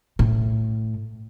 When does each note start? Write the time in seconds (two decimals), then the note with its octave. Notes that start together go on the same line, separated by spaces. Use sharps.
0.19 A2